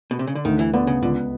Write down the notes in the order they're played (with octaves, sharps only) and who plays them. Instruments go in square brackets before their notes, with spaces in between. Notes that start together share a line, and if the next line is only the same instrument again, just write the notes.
[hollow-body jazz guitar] B2
C3
C#3
D3
[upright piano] D2 [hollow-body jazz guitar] D#3
[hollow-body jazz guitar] E3
[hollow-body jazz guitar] D3 [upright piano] B3
[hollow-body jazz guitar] C#3
[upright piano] C#2 [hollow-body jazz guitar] D3